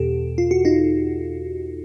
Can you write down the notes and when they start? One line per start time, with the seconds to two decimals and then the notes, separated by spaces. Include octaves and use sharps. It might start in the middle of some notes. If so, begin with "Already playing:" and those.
Already playing: E2 B2 G4 A4
0.38 F4
0.51 F#4
0.65 D#4 F4